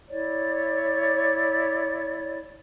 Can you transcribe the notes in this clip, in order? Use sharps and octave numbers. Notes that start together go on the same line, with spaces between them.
E4 C#5 D5